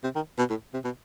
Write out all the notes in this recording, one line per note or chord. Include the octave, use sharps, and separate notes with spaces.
C3
D#3
B2
A2
C3
B2